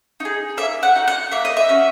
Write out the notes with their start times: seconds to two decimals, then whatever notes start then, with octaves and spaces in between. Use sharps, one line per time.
0.20 D#4 G#4
0.57 A#3 E5
0.83 F#5
0.95 D#4 F#4
1.08 F#5
1.32 A#3 E5
1.45 D#5
1.57 E5
1.69 C#4 F#4